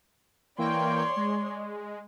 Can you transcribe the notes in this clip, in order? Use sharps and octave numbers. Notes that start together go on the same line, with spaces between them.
E3 A#3 C#5 D5 G5 C6
G#3